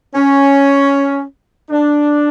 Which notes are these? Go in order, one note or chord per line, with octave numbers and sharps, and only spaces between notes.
C#4
D4